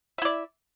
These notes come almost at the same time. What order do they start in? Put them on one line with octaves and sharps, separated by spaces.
E5 E4 D5